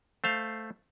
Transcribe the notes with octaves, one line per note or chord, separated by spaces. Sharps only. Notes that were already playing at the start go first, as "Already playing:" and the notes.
A3 C5 F5